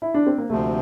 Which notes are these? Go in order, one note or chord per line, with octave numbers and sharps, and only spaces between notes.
E4
D4
C4
A#3
D2 C3 F3 A3